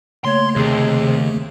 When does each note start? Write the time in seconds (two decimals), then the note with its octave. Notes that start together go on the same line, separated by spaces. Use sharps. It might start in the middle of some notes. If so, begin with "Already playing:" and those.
0.25 C#3 A3 A#3 C#5 C6
0.56 D#2 C3 G#4